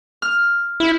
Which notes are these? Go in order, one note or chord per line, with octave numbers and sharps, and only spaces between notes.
F6
E4